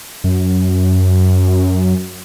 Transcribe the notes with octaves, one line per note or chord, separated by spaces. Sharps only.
F#2